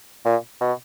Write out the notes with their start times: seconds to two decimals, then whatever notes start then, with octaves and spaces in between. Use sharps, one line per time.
0.25 A#2
0.61 B2